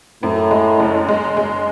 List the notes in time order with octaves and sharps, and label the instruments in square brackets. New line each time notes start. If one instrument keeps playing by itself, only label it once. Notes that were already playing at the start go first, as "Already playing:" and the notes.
[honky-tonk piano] F#2 [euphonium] A2
[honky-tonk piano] G#3
F#1
G#3
G#3